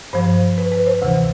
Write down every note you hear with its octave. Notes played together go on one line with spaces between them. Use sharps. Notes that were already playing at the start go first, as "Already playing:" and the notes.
G2 F3 C5
B4
B4
C5
D2 C3 E3